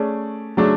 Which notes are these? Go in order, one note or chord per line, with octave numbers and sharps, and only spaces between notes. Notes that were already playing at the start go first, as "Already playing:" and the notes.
Already playing: A3 C#4 G#4 D5
C#3 F#3 A3 D4